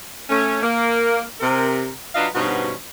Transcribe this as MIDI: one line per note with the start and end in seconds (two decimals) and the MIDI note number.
0.30 0.62 57
0.30 0.62 61
0.63 1.22 58
1.40 1.89 48
1.40 1.89 70
2.15 2.27 54
2.15 2.27 62
2.15 2.27 65
2.15 2.27 71
2.15 2.27 75
2.15 2.27 77
2.34 2.72 43
2.34 2.72 47
2.34 2.72 53
2.34 2.72 61
2.34 2.72 63
2.34 2.72 66